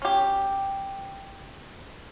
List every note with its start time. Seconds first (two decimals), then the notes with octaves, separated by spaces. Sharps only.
0.02 C#4 G4